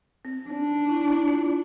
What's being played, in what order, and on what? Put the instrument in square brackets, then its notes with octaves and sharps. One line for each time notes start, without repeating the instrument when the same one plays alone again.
[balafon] C4
[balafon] C4 [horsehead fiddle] D4
[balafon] D#4
E4
E4
F4